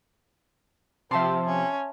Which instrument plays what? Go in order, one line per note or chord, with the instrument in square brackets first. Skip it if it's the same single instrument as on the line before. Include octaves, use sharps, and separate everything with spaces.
[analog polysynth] C3 F3 [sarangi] C4 [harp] E5 A5 C6
[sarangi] C#4